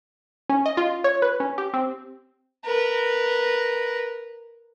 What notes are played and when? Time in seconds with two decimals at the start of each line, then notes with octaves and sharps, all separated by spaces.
0.49 C#4
0.66 D#5
0.77 F4
1.04 C#5
1.22 B4
1.40 C#4
1.58 G4
1.74 C4
2.66 A#4 B4